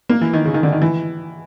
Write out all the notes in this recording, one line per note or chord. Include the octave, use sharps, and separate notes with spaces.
A#3
E3
D#3
C#3
D#3
D3
D#3
E3